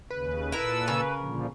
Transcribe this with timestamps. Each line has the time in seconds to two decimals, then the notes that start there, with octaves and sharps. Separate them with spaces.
0.10 D#2 C#3 B4
0.52 A#2 E4 A4 A#4 E6
0.88 C#3 A#4
1.18 A#2 D3 F3